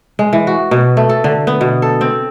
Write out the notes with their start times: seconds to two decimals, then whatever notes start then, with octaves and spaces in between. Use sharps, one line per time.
0.19 G#3
0.33 E3
0.47 F#4
0.71 B2
0.97 A3
1.09 A4
1.24 D3
1.47 B3
1.61 B2
1.82 A4
2.01 C4